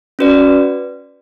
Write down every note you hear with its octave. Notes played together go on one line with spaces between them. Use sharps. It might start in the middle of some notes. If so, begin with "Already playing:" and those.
C#4 F#4 B4 D5